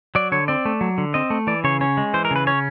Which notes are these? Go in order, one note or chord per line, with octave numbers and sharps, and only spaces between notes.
F#3 D5
D3 C#5
C4 D5
A3
F#3
D3
C4 D#5
A3
E3 D5
C#3 C#5
C#4 C#5
G#3
E3 C5
A#4
C#3 B4
C#4 C#5